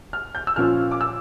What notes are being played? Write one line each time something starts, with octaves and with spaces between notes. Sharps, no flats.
F6
G6
E6
A#2 F3 C#4 F4 F6
D6
E6